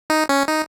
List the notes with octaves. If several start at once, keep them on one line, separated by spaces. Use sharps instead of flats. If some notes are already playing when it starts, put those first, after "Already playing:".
D#4
C#4
D#4